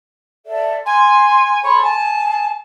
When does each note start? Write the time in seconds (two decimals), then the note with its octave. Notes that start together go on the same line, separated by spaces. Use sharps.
0.46 A4 D5 E5
0.86 G#5 C6
1.63 A4 C#5 B5 C6
1.82 G#5 A5